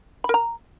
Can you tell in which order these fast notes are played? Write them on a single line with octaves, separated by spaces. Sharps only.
B5 A#4 A#5